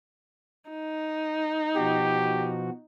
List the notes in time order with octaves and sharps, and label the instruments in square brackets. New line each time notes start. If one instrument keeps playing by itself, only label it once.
[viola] D#4
[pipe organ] B2 F3 F#4 [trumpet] G4